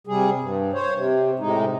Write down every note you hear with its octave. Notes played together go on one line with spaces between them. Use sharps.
C3 G3 G#4
G2
C5 C#5
C3
A2 C3 G#3 D#4